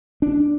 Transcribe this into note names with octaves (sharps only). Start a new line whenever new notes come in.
D4